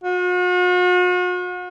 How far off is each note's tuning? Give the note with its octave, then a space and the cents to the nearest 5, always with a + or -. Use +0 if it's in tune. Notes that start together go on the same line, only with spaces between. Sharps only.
F#4 -45